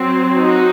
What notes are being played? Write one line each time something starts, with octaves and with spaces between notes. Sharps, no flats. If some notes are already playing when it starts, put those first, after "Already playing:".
Already playing: F#3 C4
D#4 F#4